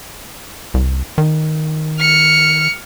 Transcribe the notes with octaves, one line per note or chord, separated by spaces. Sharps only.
C2
D#3
F6 C#7